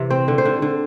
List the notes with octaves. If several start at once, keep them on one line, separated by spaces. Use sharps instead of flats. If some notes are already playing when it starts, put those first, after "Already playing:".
Already playing: C3 E3
C4 C5
D3
C5
D3
D3